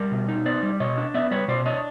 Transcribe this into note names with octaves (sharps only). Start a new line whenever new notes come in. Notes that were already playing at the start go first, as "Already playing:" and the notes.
Already playing: G3 A#4
B2
D#4
B3 C5 D5
G3
B2 C#5 D#5
D4
B3 D5 E5
G3 B4 C#5
B2 C5 D5
D4 C#5 D#5